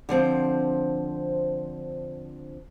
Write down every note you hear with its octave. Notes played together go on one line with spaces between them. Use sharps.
D3 F3 C4